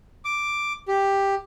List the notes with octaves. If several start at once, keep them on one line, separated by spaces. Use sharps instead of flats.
D6
G4